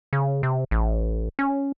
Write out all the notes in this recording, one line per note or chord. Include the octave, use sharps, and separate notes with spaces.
C#3
C3
A1
C#4